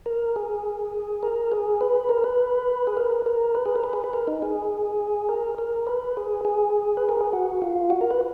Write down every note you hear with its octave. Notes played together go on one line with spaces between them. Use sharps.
A#4
G#4
A#4
G#4
B4
A#4
B4
G#4
A#4
A#4
B4
G#4
A#4
B4
G#4
B4
A#4
D#4
G#4
A#4
A#4
B4
G#4
G#4
B4
A#4
G#4
F#4
F4
F#4
A#4
B4